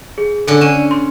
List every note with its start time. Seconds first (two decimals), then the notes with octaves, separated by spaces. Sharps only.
0.18 G#4
0.48 D3 C#4 A4
0.61 C#4 D5 D#7 E7
0.91 C6